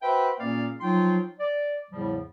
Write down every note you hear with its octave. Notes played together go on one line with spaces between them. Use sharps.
F#4 B4 C5 E5 G5
A#2 A#3 C#4 G#4 D5 F5
F3 F#3 D#4 F4 G5 C6
D5
E2 A2 C#3 F3 G3